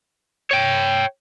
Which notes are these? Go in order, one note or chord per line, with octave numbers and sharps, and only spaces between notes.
C#5 G5